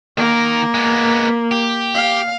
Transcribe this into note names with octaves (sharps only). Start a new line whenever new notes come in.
D#3 A#3 A#4
G#3 B3
G4
F5